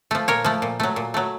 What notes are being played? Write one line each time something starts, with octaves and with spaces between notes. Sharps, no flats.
F3 A3
A#2 A#4 C#5
F3 A3
A#2
F#3 A3
A#2
F#3 A3